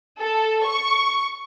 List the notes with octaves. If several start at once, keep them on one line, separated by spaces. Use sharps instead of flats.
A4
C#6